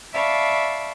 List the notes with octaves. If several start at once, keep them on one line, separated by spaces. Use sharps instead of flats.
D5 E5 F5 A5 B5 C#6